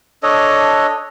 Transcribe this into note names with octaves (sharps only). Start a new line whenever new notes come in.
D4 A4 C#5 D#5